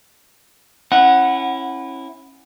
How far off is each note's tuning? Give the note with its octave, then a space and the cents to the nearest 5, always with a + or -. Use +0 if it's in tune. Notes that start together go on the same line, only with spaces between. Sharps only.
C#4 -35 E4 +0 F#5 +0